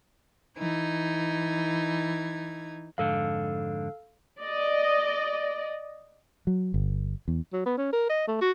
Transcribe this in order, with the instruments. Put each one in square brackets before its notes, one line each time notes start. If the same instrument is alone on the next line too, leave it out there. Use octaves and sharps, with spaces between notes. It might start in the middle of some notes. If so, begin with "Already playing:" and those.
[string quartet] E3 D#4 G#6
[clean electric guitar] F2 G#2 D3 [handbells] A4 F5
[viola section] D5 D#5
[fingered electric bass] F#3
G1
E2
[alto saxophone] F#3
B3
C#4
A#4
D#5
A3
F#4